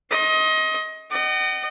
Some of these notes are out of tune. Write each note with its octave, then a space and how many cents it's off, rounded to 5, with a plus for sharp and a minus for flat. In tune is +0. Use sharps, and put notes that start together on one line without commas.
D#5 +25 C6 +40
D#5 -25 F#5 +40